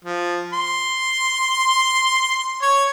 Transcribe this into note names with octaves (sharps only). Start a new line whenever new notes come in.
F3
C6
C#5